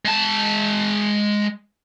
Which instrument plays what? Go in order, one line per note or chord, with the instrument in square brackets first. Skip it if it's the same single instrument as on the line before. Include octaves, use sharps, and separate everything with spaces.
[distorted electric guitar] G#3 A5